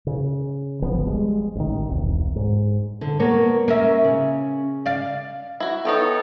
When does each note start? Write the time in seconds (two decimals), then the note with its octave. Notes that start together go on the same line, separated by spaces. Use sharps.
0.07 C#3
0.82 D1 G#1 F3 B3
1.07 G3 G#3
1.55 A1 D#3
1.88 E1 C2
2.36 G#2
3.01 D3
3.19 A#3 B3 C#5
3.68 A#3 C#4 A#4 E5
4.04 C#3
4.86 D5 F5
5.60 E4 F#4
5.85 B3 D#4 E4 A4 C#5 G5